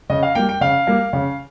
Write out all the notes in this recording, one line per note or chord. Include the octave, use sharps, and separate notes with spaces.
C#3 D#5
F5
G3 A#3 G5
G5
C#3 F5
G3 A#3
C#3